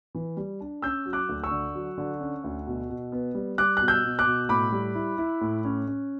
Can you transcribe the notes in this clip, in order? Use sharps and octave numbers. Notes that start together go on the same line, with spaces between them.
E3
G3
D4
C#4 E6 G6
F#3
D6 F#6
D2
C#6 E6
D3
F#3
D3
C#4
D2
B2
B2
B3
G3
G3 D6 F#6
B2 F#6
E6 G6
B2
D6 F#6
B2
A2 B5 D6
G3
E4
E4
A2
C#4
C#4